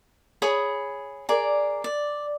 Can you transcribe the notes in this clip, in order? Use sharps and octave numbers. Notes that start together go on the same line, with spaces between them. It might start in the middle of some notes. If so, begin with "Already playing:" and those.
G#4 C#5 B5 D#6
G#4 A#4 D5
D5